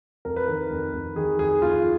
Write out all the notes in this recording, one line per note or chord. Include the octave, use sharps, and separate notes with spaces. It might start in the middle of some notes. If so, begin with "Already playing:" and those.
F2 A#4
B4
D#3 A#4
F2
F2
D#3 G#4
F2 G#4
F2 F4